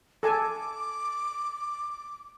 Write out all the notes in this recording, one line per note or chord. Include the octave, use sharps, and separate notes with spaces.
A4 G#5 A5 D6